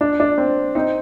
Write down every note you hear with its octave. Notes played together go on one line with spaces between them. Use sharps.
D4
D4
C4
C4 D#4